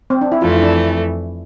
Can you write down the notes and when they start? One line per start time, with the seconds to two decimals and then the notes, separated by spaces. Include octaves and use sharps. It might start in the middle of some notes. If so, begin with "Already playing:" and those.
0.10 C4
0.21 D4
0.32 E4
0.41 F2 E3 A3 F4
0.56 E4
0.62 D4